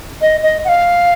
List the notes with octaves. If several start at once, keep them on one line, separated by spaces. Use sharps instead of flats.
D#5
D#5
F#5
F5